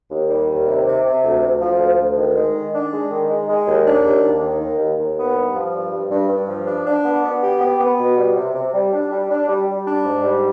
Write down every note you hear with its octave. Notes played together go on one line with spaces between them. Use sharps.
D#2
G3
D#2
C3
C3
C3
D2
D2
F3
D2
D2
D#3
G#3
D#3
D4
G#3
D#3
G#3
G#3
D#2
D4
D#2
D#2
D#3
D#2
D#2
D#2
B3
G2
F3
G2
G2
G2
G2
F3
D4
D4
B3
B3
G4
B3
B3
B2
G3
C3
C3
G3
D4
G3
D4
G3
G3
D4
G#2
G3